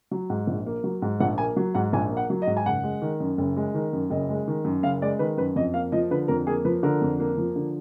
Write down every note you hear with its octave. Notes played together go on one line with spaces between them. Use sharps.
F#3
G#2
A#1
A#3
F#3
G#2
A#1 F#5
A#3 G#5
F#3
G#2 F#5
A#1 G#5
A#3
F#5
F#3
D#5
G#2
G#5
F#1 F#5
G#3
D#3
F#2
F#1
G#3
D#3
F#2
F#1 D#5
G#3
D#3
F#2
F#1 F5
G#3 D5
D#3 B4
F#2 B4
F2 D#5
A#3 F5
F3 D#5
D3 B4
F2 A#4
A#3 G#4
F3 B4
D3 A#4
F2
A#3
F3
D3